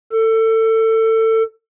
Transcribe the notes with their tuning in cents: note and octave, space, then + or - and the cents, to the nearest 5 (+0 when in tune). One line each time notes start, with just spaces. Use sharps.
A4 +25